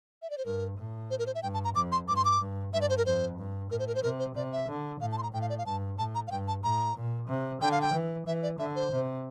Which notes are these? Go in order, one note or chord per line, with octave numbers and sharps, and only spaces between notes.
E5
D5
C5
G2 A#4
A2
C5
A#4
C5
E5
G2 G5
A5
A#5
F2 D6
C6
G2 D6
C6
D6
G2
G2 E5
D5
C5
A#4
F2 C5
G2
A2 A#4
C5
A#4
C5
C3 A#4
C5
C3 D5
E5
D3
A2 F5
A5
C6
A#5
A2 G5
F5
D5
F5
G2 A5
A2 A5
A#5
F5
G2 G5
A5
A2 A#5
A#2
C3
D3 G5
F5
G5
E3
E3 E5
D5
D3 E5
C5
C3